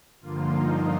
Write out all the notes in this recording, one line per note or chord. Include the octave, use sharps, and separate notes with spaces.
G2 D3 F3 A#3 F4
D#4